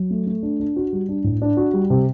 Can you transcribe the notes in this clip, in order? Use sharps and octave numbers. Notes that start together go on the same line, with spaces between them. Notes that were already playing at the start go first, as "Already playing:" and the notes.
Already playing: F#3
A3
A3
D4
D4
F#4
G3
D4
A2
D4
F#4
G3
C3